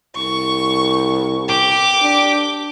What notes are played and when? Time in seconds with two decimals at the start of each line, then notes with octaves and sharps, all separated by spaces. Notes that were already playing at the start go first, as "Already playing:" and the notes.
0.16 C2 C#6
1.49 G4 D6
2.02 D4